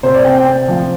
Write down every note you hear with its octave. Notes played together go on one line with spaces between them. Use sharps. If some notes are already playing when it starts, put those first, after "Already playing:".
C3 C5
D5
C4 G5
G5
C4
F3